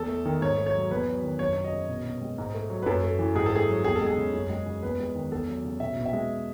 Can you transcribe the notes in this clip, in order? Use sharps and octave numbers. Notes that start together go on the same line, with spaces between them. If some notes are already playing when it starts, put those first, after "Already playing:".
Already playing: E2 A4
A3
D#3
G#2 C#5
A3
C#5
F#3
E2 B4
F#3
D#3
F#2 C#5
F#3 C#5
D#5
C#3
B2
B2
G#3
G#2
A3
F#3
B4
F#2 A4
A3
E3
G#2 G#4
A4
A3 G#4
F#3
E2 G#4
A4
G#3
G#4
C#3
F#2
G#3
C#3
E2 B4
G#3
D#3
E2 A4
F#3
C#3
B2 E5
B2
E5
G#3